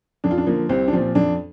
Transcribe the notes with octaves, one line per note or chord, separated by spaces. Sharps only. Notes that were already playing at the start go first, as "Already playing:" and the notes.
F2 D4
F4
D4
D3 F3 A#3
C2 C4
D4
A#2 F3 C4
F2 D4